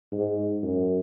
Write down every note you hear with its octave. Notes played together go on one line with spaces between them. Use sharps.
G#2
F#2